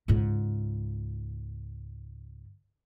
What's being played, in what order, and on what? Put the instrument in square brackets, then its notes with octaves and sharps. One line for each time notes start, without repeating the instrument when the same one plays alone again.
[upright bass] C#2 G#2